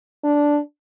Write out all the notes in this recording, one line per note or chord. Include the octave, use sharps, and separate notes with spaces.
D4